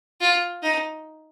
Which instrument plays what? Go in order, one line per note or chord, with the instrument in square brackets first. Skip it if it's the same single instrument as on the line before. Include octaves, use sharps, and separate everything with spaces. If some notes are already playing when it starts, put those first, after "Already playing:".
[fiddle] F4
D#4